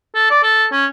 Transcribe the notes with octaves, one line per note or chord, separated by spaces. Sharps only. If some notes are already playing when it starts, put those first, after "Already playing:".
A4
D5
A4
C#4